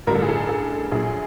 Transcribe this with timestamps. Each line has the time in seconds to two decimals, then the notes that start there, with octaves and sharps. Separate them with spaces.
0.07 A1 G2 D3 G3 A#4
0.15 A4
0.22 G#4
0.29 A4
0.49 A4
0.91 A#1 A#2 F#3 G#4